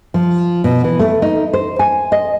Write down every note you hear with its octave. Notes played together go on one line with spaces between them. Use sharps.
F3
B2
E3
A3
D#4
C5
G#5
D#5